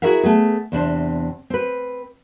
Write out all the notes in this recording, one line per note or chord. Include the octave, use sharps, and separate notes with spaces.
E4 F#4 G#4 A#4 E5 F5
A3 B3 G#4
E2 C3 D4 C5
C4 B4